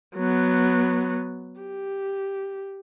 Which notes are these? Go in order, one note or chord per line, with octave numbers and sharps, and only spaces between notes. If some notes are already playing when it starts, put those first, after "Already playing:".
F#3 B3
G4